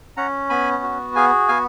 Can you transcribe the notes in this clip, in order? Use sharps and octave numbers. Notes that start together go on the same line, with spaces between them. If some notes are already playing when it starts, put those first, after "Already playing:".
C#4 F#5 A#5
B3 G#5 B5
F#4
G#4 F5 G#5
B3 F5 G#5